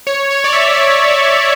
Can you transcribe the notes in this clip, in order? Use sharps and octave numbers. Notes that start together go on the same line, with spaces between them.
C#5
C#5
D5
E5